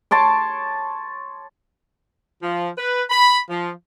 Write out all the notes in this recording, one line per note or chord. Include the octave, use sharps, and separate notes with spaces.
C#5 A5 C6 D6
F3
B4
B5
F3